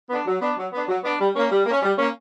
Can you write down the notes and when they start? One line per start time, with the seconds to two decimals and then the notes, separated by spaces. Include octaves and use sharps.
0.10 B3 D4
0.25 F#3
0.41 B3 D4
0.56 F#3
0.72 B3 D4
0.88 F#3
1.04 B3 D4
1.19 G3
1.35 A#3 C#4
1.51 G3
1.66 A#3
1.71 C#4
1.82 G3
1.98 A#3 C#4